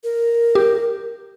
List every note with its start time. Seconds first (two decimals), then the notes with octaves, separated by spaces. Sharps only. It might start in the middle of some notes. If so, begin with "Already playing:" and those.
0.04 A#4
0.55 G4